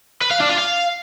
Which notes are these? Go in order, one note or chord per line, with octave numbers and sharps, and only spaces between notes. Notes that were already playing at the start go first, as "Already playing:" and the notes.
B4
F5
D4
F4
F5